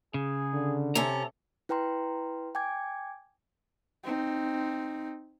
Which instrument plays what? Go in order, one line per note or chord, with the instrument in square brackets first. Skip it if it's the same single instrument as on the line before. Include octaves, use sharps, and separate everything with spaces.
[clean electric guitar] C#3 [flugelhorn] G#4
[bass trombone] D3
[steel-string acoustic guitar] C3 C#4 [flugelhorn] A4 [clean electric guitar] A#5
[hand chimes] E4 B4 G5 A#5 C6
G5 G#5 D6 G#6
[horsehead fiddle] C4 D#4